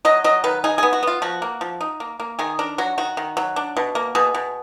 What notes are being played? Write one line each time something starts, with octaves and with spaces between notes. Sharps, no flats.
F#3 D#5
F#3 D#5
D#3 B4
D#4 G#4
B3 G#4
F#4
B3 F4
F3 F#4
A#3
F3
D#4
A#3
A#3
D#3 G#4
D4 A#4
F#3 F#4
D#3 F#4
D#3
F#3
D4
B2
A#3
B2 G#4
B2